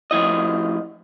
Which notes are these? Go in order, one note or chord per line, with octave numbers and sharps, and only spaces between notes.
A2 F3 E4 D#5